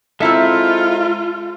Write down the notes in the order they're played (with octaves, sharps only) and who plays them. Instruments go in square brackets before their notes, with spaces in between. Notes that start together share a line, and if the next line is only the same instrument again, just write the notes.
[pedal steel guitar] G#3 E5 A#5 [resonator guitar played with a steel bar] C4 E4 A4 [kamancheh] F4